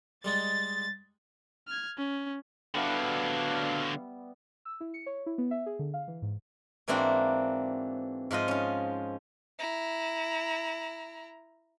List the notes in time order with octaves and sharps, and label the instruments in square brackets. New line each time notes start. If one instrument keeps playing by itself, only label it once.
[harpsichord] G3 G#3 D#4 [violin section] A6
[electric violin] F6 G#6
C#4
[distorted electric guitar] D3 F#3 [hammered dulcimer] G3 B3 E5 [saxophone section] D4 F5
[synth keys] E6
E4
C#7
C#5
E4
B3
E5
G#4
D3
F5
E3
G#2
[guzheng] G#2 E3 A#3 C4 D4 F#4
G#2 F3 F4 D#5
C#4 F4
[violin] E4 A#5